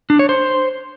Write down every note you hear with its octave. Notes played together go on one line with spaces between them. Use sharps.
D4
C#5
C5